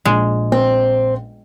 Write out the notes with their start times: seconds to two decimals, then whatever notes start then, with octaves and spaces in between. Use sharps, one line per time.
0.05 A#1 G#3
0.52 C4